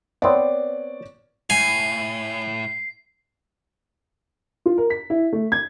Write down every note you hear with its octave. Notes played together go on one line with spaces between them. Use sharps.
B3 C4 C#5 D5
A2 G#5 C7
F4
A#4
B6
E4
A3
G#6